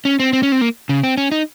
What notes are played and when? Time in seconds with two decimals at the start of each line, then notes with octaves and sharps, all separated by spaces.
0.05 C#4
0.20 C4
0.33 C4
0.43 C#4
0.52 C4
0.61 A#3
0.89 C#3
1.04 C4
1.17 C#4
1.32 D#4